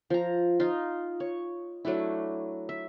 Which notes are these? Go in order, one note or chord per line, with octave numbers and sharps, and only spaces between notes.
F3 A#5
D#4 F4
C#5
F#3 A3 D4 E4
E5